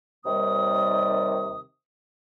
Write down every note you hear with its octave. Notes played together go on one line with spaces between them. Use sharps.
D#2 C3 D#3 G3 D#6